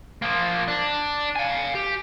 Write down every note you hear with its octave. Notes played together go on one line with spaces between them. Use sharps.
F3 A#3
D4
F5 G#5
G4